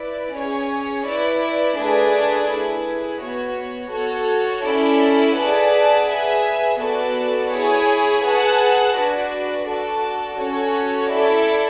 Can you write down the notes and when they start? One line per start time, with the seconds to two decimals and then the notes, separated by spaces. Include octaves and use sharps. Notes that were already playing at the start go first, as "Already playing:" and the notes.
Already playing: E4 B4 D5
0.34 C#4 G#4 C#5
1.06 E4 B4 D5
1.78 A3 D4 G#4 B4 D5
2.49 E4 G#4 B4
3.21 B3 F#4 C#5
3.93 F#4 A4 C#5
4.65 C#4 E4 A4 D5
5.36 G#4 B4 D5 F#5 A5
6.08 G#4 B4 E5 G#5
6.80 B3 F#4 A4 D5 A5
7.52 E4 G#4 C#5
8.23 G#4 B4 F#5 A5
8.96 D4 F#4 B4 D5
9.67 F#4 A4 D5 A5
10.39 C#4 F#4 A4 C#5
11.10 E4 A4 D5